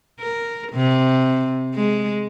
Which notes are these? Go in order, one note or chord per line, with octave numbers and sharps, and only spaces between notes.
A#4
C3
G#3